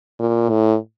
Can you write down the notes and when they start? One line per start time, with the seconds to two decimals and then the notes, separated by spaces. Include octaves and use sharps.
0.19 A#2
0.49 A2